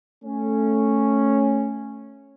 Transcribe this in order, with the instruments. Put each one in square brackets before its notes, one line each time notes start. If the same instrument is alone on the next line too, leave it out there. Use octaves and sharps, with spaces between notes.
[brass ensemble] A3 C#4